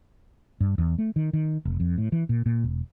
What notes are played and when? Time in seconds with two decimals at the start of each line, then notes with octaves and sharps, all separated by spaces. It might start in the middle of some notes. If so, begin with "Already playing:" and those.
0.61 G2
0.78 E2
0.98 A3
1.16 D#3
1.33 D#3
1.65 F1
1.80 F2
1.98 A2
2.12 E3
2.29 A#2
2.46 A#2
2.64 E1